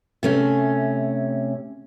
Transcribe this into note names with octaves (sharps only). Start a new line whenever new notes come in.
C3 A3 C#4